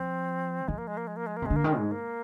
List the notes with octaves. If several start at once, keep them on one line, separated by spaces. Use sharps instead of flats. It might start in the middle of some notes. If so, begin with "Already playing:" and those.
Already playing: F3 C4
F3 G#3
A#3
G#3
A#3
G#3
A#3
G#3
A#3
C3
D3 G#3
A#3
D#3 G#3
G#2
A#3